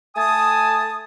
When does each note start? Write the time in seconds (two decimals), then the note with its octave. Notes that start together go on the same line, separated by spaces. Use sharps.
0.16 A3 G#5 A5 D#6